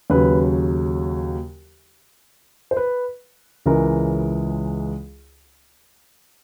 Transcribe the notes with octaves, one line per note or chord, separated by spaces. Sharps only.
D#2 C#3 F#3 B4
C5
B4
C#2 C#3 E3 G#3 A#4